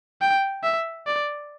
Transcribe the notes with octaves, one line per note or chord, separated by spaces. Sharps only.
G5
E5
D5